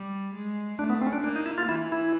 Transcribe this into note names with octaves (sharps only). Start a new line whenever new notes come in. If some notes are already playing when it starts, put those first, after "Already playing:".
Already playing: G3
G#3
A3 D4
B3
C4
C#4
D4
A#3 D4
D#4
E4
F4
E3 E4
E4